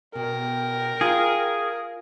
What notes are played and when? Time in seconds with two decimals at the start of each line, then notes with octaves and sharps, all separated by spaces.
0.15 B2 A#4 G5
1.01 F4 G#4